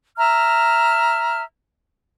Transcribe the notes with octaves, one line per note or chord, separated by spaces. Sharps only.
E5 A#5 F6